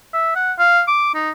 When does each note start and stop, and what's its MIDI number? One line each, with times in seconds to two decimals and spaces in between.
0.14 0.34 76
0.36 0.52 78
0.59 0.82 77
0.88 1.10 86
1.14 1.31 63